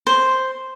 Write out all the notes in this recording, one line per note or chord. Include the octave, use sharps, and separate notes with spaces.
C5